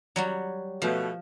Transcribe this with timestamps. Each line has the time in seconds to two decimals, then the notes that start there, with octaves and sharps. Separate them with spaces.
0.16 F#3 G3 F#4
0.82 B2 F3 A3